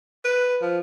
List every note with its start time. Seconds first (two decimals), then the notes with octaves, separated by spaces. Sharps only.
0.25 B4
0.61 F3